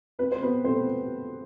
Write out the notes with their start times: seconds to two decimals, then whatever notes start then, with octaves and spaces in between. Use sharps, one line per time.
0.19 C4 B4
0.32 C5
0.41 B3 C4 B4
0.64 A3 C4 C5